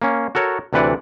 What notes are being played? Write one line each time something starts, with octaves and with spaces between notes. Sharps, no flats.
A#3 C#4
F#4 A4 A#4 C#5
D2 C3 E3 B4 D5 F#5